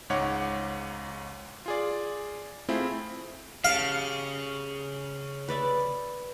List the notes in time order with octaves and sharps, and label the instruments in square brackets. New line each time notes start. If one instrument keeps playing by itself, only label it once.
[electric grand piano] C#2 G#2 C#5 F#5 D6
F4 G#4 D5
A3 C4 E4 F4 G#4
[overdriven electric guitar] C#3 [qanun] G4 A5 [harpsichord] F5
[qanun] B4 D5 E5